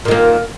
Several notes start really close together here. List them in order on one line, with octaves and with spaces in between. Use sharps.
A#2 D#3 A#3